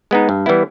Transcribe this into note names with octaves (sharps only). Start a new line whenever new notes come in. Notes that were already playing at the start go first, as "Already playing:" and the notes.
G#3 B3 D#4
G2
E3 G3 B3 E4